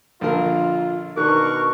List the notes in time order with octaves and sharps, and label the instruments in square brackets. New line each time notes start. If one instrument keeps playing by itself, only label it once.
[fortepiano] A#1 D3 A#4 [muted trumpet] F4
[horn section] B2 D4 A#4 [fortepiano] D#3 [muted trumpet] C#6 [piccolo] F#6